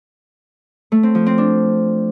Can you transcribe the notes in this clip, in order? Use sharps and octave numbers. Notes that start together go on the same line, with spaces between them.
A3
C4
F3
C4
D4